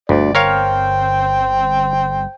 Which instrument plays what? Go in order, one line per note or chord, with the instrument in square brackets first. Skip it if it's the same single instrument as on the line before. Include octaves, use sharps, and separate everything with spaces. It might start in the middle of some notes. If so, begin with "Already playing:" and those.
[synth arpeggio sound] G1 [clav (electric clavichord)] D2 [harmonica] D5
[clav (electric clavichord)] A#4 C#5 F5 [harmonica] C5 G5